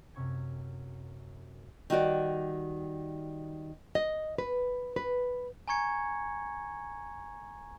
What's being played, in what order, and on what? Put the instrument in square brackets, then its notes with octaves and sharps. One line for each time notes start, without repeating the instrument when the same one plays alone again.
[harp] F#2 C3 C#6 G#6
[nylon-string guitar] D#3 G3 F#4 D5
D#5
B4
B4
[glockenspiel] G#5 A#5 C#6 G#6 C#7